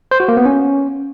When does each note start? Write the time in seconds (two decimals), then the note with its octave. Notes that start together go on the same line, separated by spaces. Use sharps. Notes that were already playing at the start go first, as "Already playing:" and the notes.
0.11 C5
0.20 F#4
0.28 A#3
0.37 B3
0.45 C#4